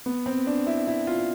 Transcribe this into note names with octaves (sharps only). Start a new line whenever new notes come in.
B3
C4
D4
E4
E4
F4